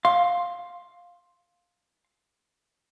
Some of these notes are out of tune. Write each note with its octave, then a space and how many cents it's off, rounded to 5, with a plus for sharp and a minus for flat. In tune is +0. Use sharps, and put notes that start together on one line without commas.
F5 +10 C6 +10